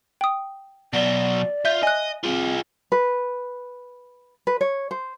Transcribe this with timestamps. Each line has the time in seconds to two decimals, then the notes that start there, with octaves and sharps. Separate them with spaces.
0.21 G5 D#6
0.93 B2 F#3 D5
1.65 F4 E5 G6
1.83 D#5 G#5 F#6
2.24 C4 F4 G#4
2.92 B4
4.47 B4
4.61 C#5
4.91 C5